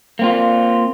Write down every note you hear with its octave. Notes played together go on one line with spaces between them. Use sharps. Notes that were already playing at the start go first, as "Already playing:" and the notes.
A#3 C4 F4